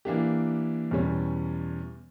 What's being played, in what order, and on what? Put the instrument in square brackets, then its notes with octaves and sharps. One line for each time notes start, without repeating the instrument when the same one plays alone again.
[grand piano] E3 A#3 D4 G4
E2 B2 G3 C#4